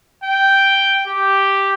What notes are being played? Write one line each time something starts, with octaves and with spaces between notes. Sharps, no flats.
G5
G4